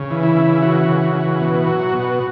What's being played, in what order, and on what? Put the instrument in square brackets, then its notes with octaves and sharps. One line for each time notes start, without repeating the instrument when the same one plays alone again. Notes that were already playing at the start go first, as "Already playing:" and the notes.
Already playing: [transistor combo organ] C#3
E3
E4
C#3
E3 F#4
C#3
E3
B2
F#3
B2